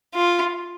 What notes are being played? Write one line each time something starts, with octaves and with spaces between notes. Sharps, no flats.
F4